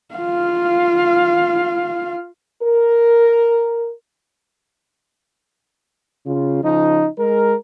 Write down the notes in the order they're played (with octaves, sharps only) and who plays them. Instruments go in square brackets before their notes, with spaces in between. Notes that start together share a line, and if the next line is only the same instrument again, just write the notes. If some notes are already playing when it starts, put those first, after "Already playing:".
[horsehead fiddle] F4 F5
[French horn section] A#4
[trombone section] C#3 F4
C#3 F3 D#4
G#3 A#4